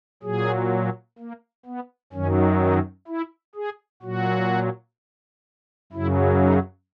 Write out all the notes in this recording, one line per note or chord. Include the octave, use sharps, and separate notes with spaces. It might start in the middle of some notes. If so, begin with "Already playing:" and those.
A#2 F#3 G#4
A#3
B3
F#2 D#3 F#3 C#4
D#4
E4
G#4
A#2 F#3 F#4
F#2 C#3 F#3 E4
D#4